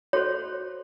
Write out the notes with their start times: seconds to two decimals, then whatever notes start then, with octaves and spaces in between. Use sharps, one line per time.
0.13 F#4 A4 C5 C#5